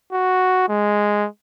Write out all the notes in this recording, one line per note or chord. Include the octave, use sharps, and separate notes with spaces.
F#4
G#3